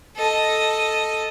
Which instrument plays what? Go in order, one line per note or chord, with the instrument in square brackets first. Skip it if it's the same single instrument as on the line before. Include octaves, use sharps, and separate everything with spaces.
[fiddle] A4 D#5